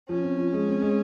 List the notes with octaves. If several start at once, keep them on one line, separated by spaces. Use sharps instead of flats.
F3 C#4
C4
F3
G#3
C4
G#3